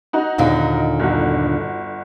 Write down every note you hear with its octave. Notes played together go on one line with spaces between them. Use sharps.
D#4 F#4
D#2 A#2 D3
G1 F#4